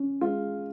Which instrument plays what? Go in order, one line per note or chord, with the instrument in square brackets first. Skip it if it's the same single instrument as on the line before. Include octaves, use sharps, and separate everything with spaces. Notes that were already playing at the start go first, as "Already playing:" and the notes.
Already playing: [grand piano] C#4
[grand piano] G#3 [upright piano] F4